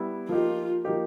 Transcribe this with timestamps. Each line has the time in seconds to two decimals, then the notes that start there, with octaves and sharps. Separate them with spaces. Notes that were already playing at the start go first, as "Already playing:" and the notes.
Already playing: G3 B3 E4
0.29 F3 A#3 D#4 F4 G4
0.85 F3 A#3 D#4 G4